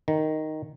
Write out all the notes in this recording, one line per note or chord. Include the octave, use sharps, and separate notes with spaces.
D#3